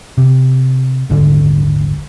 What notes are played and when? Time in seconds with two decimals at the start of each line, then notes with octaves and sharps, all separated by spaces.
0.18 C3
1.10 D#1 G#1 G#2 D3